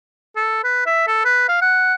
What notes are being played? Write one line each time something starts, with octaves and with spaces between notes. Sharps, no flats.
A4
B4
E5
A4
B4
F5
F#5